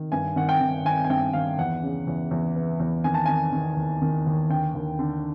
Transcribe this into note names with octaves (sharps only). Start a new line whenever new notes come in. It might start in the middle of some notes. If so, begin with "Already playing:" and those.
Already playing: D#3
G2 G#5
D#3 F#5
G5
D#3
D#3 G#5
G#5
G2 G5
D#3 F5
E2 F#5
C#3
E2
E2
E3
E2
D#3 G#5
A5
D#3 G#5
D#3
D#2
D#3
D#2
D3 G5
D#2
D3